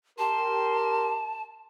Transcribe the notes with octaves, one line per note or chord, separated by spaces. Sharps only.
G4 A#4 A5 C6